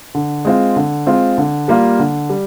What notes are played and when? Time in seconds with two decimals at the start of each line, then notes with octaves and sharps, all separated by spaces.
0.15 D3
0.45 G#3 C4 F4
0.76 D3
1.06 G#3 C4 F4
1.38 D3
1.68 G3 A#3 F4
1.99 D3
2.30 G3